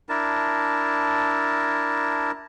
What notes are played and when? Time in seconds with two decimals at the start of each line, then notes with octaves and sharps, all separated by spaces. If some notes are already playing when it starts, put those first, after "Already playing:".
0.09 D4 E4 A#4 A5